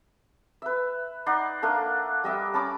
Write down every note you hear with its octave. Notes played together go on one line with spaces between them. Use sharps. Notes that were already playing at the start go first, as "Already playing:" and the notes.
B4 E5
D#4 D5 F#5 C6
A3 A#3 D4 A4
G3 D#5 E5 D6
C#4 A5 B5 D6